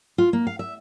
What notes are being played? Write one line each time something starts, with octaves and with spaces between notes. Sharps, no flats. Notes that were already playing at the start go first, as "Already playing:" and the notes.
F4
A#3
F5
E5